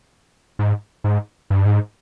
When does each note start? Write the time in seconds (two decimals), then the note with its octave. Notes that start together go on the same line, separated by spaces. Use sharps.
0.59 G#2
1.04 G#2
1.50 G2
1.65 G#2